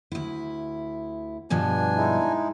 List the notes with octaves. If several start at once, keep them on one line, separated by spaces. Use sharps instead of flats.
D2 E4
G2 B2 F3 D4 G#5
G#3 D#4 E4